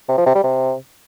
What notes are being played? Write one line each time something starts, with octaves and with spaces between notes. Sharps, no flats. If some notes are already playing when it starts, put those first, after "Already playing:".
C3
F3
C3
G3
C3